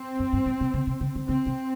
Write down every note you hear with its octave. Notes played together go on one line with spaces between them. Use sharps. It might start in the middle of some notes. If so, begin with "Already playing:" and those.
Already playing: C4
F#2
G2
A2
C3
C#3
C3
C#3
D3
C#3 C4
C3